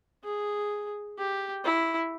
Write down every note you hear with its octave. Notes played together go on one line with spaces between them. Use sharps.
G#4
G4
E4